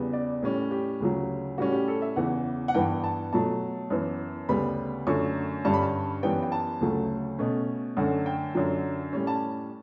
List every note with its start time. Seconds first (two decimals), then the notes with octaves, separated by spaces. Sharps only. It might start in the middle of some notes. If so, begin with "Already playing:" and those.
Already playing: E2 C#3 G3 B3
0.13 D5
0.42 A2 G3 C#4
0.71 G4
1.00 D2 C#3 F#3
1.58 A2 G3 C#4 F#4
1.73 G4
1.88 A4
2.02 E5
2.16 E2 C#3 E3 F#5
2.68 F#5
2.74 G2 E3 B3 G5
3.04 A5
3.33 B2 F#3 A3 A5
3.90 F#2 E3 B3
4.49 D2 C#3 G3 B3 B5
5.07 F#2 D3 F#3 A3 C#6
5.64 G2 D3 G3 C#4 A5
5.74 B5
5.83 A5
6.23 F#2 E3 G3 B3 G5
6.43 G5
6.52 A5
6.81 D2 C#3 F#3 A3
7.39 B2 A3 C#4
7.97 F#2 D3 A3 C#4 F#5
8.26 G5
8.55 F#2 D3 F#3
9.13 A2 G3 C#4
9.27 A5